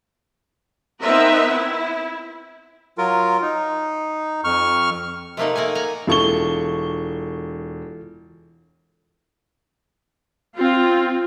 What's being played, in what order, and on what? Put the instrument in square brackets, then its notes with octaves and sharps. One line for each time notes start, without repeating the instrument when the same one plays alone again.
[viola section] B3 C4 D#4 A#4 B4 E5
E4
[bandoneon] F#3 F4 A#4
D#4
F2 C#6 F6
[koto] C3 A3 A#3 D#4 F#5
A3 A#3 F#5 G#5
F#5 G#5 A#5
[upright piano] E1 C#6 G7 [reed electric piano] E4 F4 A4
[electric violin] C4 [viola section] F4